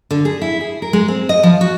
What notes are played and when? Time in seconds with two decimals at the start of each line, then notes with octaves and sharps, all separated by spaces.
0.11 D3
0.25 G#4
0.42 E4
0.61 G#4
0.82 A#4
0.93 G#3
1.08 C4
1.29 D#5
1.43 F3
1.61 F#4